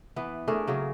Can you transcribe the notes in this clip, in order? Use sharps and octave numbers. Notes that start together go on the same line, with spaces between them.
E3 B3
A3 D4 G#4 A#4
C#3 F#3 A#3 G#4